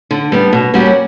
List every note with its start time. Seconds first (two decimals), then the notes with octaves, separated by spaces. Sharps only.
0.11 D3
0.32 G3 B3 D4
0.53 B2
0.74 G3 A#3 C#4 F#4